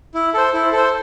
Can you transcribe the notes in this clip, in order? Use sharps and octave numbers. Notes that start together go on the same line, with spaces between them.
E4
A4 C5
E4
A4 C5